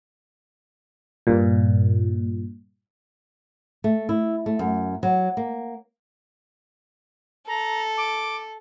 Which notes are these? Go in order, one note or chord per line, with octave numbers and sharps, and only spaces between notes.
G2 A#2
A3
E4
A3
F#2
F#3
A#3
A4 A#5
D6